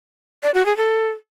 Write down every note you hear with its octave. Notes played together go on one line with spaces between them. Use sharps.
D5
F#4
G#4
A4